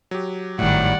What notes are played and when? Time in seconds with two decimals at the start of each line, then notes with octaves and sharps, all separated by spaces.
0.11 F#3 G4
0.59 G#1 A2 D#3 G3 D5 F#5